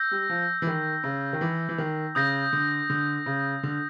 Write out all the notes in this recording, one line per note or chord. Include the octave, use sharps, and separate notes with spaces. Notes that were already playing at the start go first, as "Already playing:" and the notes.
Already playing: E6 G6 A#6
G3
F3
E3
D#3
C#3
D#3
E3
E3
D#3
C#3 D#6 G6 A#6
D3
D3
C#3
D3